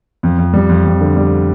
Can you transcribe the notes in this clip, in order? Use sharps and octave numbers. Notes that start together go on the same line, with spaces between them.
F2
F2
G3
F2
F2
D3
G3